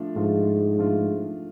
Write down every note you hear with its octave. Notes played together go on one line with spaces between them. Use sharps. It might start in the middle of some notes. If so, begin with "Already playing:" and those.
Already playing: F3 A3 D4 F4
G#2 F3 A3 D4 F4
F3 A3 D4 F4